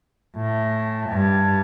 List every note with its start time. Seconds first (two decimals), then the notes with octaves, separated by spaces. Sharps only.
0.36 A2
1.10 G2